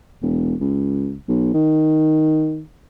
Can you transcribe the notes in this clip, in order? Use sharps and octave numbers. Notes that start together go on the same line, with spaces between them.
E1
C#2
B1
D#3